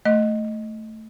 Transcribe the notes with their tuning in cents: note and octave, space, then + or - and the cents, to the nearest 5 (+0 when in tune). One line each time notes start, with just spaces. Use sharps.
A3 +0 D#5 +0